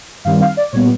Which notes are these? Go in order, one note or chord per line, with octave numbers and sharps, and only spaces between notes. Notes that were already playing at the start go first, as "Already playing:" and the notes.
G2 D#3 G3 C4 F5
F5
D5
A#2 G3 B3 C#5